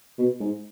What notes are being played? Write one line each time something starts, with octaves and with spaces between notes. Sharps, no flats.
B2
G#2